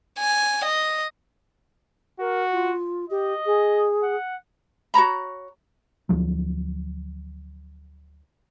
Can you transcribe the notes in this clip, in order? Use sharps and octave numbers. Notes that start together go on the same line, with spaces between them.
G#5
D#5
F#4 A#4
F4
G4 D#5
G#4
F#5
F#4 C#5 A#5 B5
D2 F3 F#3